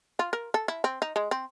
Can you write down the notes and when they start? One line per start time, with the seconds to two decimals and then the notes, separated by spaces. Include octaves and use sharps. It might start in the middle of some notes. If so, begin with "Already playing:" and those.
0.19 F4
0.33 A#4
0.54 A4
0.68 E4
0.84 C4
1.02 D#4
1.16 G#3
1.31 C4